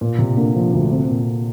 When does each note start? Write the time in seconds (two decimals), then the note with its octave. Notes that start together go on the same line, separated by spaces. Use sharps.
0.01 A#2 A#3
0.19 C3 A#3
0.37 D3 A#3
0.56 F3
0.73 D2
0.92 C4
1.09 A#2